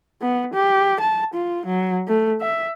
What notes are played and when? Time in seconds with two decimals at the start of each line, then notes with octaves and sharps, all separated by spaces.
0.22 B3
0.54 G4
1.01 A5
1.34 F4
1.66 F#3
2.08 A3
2.41 E5